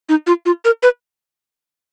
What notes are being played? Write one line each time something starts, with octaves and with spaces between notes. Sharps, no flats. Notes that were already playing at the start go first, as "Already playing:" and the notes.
D#4
F4
F4
A#4
B4